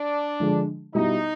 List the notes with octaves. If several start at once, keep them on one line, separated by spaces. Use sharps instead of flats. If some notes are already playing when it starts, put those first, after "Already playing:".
Already playing: D4
D3 F3 G#3
B2 G3 B3 D#4 E4